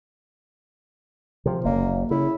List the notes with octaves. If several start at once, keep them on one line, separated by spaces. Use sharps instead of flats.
C3 F3
F#1 F#2 A#3
C#3 E4